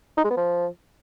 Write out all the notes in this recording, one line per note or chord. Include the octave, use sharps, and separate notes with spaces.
D#4
G#3
B3
F3